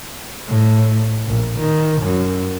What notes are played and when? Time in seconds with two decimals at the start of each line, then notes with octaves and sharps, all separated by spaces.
0.47 A2
1.26 A#1
1.60 D#3
2.02 F#2